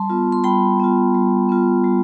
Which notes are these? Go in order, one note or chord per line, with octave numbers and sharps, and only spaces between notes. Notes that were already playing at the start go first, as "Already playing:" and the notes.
Already playing: G3 A5 C6
B3 F4
C6
G3 G5 B5
B3 F4
G3
B3 F4
G3